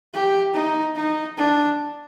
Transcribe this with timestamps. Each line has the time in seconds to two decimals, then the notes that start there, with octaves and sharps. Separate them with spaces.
0.14 G4
0.54 D#4
0.96 D#4
1.38 D4